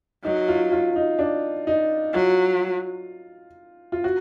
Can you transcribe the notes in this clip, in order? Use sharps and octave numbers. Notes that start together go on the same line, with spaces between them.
F#3 D#4
F4
F4
D#4
D4
D#4
F#3 F4
F4
F#4